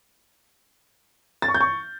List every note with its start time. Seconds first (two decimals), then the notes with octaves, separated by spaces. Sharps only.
1.42 A6
1.48 C#6
1.54 G6
1.61 C#6